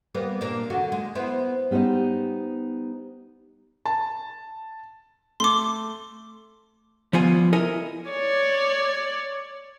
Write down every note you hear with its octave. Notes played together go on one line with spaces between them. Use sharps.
G3 A#3 B3
A#2 A#3 D4
D3 D#3 F#4
G#3
B3 E4 C5
G3 B3 D#4 C5 D#5
A5
A3 C6 D6
F3 G3 B3 F4 C5 G#5
E4 A4 A#4 D#5 G#5
C#5 D5